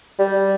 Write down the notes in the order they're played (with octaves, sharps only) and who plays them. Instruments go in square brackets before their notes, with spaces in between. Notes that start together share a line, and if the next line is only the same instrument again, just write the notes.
[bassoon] G3